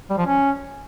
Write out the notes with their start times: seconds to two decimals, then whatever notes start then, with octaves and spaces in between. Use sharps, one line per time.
0.10 G3
0.18 F3
0.26 C#4